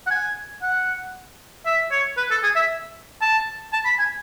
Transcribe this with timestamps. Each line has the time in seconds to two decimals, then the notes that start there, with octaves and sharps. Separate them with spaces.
0.07 F#5
0.11 G#5
0.62 F#5
1.66 E5
1.92 C#5
2.17 B4
2.31 A4
2.43 G#4
2.56 E5
3.22 A5
3.73 A5
3.85 B5
3.99 G#5